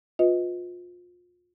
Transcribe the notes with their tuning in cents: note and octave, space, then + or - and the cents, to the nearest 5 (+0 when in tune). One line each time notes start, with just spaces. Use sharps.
F4 +30 B4 +15 D#5 +20